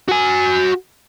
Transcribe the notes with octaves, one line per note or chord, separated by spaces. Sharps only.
F#4 G#5